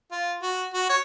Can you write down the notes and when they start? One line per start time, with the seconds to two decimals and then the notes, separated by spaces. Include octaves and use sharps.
0.11 F4
0.42 F#4
0.74 F#4
0.89 C#5